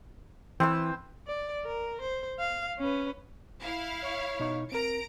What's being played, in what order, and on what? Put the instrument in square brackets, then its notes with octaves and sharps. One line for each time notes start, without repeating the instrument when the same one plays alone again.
[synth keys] E3 [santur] C4 B4 E6
[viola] D5
A#4
C5
F5
C#4 B4
[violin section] E4 F5
[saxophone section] C#5
[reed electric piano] B2 D#4 C#6
[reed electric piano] C4 A#4 [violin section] A#5 D7